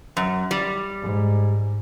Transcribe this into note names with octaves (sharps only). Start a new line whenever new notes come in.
F#2
G3
G#2